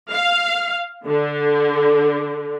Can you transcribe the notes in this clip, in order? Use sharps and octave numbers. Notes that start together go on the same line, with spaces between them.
F5
D3